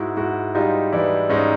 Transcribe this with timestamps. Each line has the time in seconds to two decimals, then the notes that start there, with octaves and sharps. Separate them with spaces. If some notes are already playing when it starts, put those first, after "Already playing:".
Already playing: G#2 E4 F#4
0.17 G#2 E4 F#4
0.55 G3 D#4 F4
0.93 E3 D4 E4
1.30 G#2 C#4 D#4